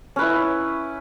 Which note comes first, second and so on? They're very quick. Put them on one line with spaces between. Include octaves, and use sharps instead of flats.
C#4 B4 E4